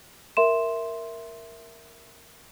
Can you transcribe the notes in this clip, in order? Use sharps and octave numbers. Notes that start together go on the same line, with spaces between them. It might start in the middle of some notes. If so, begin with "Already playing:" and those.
A#4 E5 C6 E7